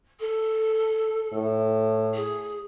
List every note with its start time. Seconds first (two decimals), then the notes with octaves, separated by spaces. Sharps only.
0.20 A4
1.33 A2
2.14 G#4